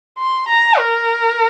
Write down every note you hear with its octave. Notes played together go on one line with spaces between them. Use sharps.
C6
A#5
A#4